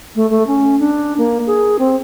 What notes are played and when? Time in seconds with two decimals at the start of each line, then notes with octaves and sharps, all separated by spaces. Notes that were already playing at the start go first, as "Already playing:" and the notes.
0.16 A3
0.30 A3
0.47 C#4
0.79 D4
1.18 A#3
1.47 G#4
1.79 C4